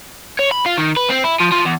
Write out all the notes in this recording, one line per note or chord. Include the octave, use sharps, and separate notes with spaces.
C#5
B5
F4
D#3
B4
C4
E4
F3
F3
E2